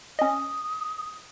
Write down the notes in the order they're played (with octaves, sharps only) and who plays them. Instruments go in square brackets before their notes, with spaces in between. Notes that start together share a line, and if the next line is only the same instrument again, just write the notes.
[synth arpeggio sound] C#4 D#5 [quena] D#6